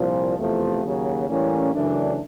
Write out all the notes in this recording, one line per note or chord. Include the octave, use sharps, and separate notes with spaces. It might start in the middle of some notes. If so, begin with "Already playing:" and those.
Already playing: C2 A#2 F3
E2 C3 F3 A3
D#2 C#3 F#3
A2 E3 G3 A#3 C#4
F#2 C#3 E3 A3 D4